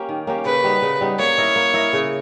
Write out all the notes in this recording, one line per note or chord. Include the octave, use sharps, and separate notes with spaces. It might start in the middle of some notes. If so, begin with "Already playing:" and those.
Already playing: A#3 C#4 G4
D#3
A#3 C#4 G4
C#3 B4
G3 B3 D#4
C#3
G3 B3 D#4
A#3 C#5
E4 A#4 D#5
A#3
E4 A#4 D#5
C#3